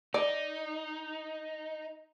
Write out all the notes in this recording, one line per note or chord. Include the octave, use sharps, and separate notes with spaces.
D#4 D5